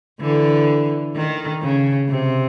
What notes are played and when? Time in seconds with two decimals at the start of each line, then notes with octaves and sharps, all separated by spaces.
0.20 D3 E3
1.15 D#3
1.62 C#3
2.09 C3